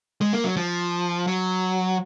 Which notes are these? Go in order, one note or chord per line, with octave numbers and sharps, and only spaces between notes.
G#3
A#3
F#3
F3
F#3